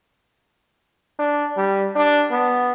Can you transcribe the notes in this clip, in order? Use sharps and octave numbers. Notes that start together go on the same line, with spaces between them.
D4
G3
D4
B3